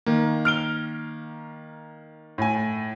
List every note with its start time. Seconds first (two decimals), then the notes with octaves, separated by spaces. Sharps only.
0.06 D#3 A#3
0.45 F6 D7 G7
2.38 A2 G#5